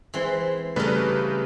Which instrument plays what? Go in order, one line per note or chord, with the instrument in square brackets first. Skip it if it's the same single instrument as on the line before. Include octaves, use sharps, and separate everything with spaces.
[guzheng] E3 G#3 C4
[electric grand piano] C#3 A3 B4 [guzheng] G3 A#4